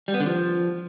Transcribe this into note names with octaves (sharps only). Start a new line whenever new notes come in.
G3
B3
D3
F3